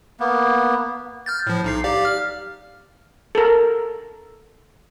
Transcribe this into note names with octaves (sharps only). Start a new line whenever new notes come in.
A#3 B3
F6 G6 A6
A2 F3
B1 D#4 C7
G4 D5 F5
F6
A4 A#4